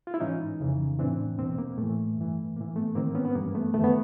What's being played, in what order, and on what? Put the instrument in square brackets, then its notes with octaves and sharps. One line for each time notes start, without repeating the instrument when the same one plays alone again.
[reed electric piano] F4
E4
G#2 E3 C#4 D#4
F2 C#3 E3
A2 E3 C4 D4
E2 B2 A#3 C4
A#3
A2 E3 A3
G2 E3
G#2 E3 A#3
A3 B3
G#2 D#3 A#3 C4
B3 C#4
B3
G2 E3 A#3
A3 B3
F#2 D#3 A3 B3
B3